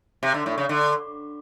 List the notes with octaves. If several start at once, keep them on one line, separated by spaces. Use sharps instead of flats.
C3
D3
A2
C#3
D3